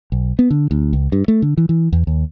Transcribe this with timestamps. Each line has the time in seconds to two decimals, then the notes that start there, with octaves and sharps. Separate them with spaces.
0.12 B1
0.39 B3
0.50 D3
0.71 D2
0.93 C#2
1.12 G2
1.28 A3
1.42 D3
1.57 E3
1.69 E3
1.92 E2
2.07 D#2